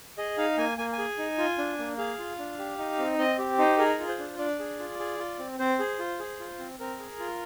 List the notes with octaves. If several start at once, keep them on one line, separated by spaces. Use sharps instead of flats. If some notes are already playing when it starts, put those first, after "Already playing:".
G#4 D#5
D#4 F5
A#3 G#5
A#3 G#5
G#5
G#4
D#4
F4
D4
A#3
G#4 F5
F4
D4
G4
D#4
C4
C4 D#5
G4
D#4 C5
G#4 A#4
F4
C5
D4
D4 D5
G#4
F4
G#4
F4
C4
C4 C5
G#4
F4
G#4
F4
C4
C4 A#4
G#4
F4